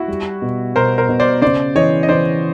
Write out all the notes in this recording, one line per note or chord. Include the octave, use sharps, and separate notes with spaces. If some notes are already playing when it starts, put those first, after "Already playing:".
Already playing: E4 F#4
G3
B2
B2 A#4 C5
A#4 C5
B2
C5 D5
C#3 C5 D5
E3 C#5 D#5
D#5
E3 C5 D5